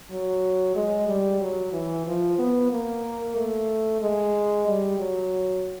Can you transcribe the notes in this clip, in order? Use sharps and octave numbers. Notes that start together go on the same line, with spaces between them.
F#3
G#3
G3
F#3
E3
F3
B3
A#3
A3
G#3
G3
F#3